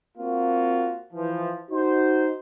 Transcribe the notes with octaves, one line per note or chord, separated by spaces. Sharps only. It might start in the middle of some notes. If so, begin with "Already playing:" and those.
A#3 C4 F4 F#4
E3 F3
D#4 F#4 C5